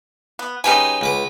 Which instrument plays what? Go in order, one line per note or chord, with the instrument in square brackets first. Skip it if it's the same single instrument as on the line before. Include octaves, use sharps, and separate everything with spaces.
[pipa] B3
[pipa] C#3 F#3 G#5 [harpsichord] D#4 G4 B4
[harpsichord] C#2 B4 D6